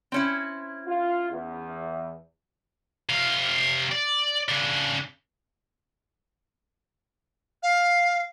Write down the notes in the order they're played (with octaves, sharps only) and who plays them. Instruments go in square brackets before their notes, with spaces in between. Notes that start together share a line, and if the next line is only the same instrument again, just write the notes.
[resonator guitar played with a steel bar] C4 C#4 E4
[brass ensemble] F4
E2
[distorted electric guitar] C3 F5
D5
C#3 D4
[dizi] F5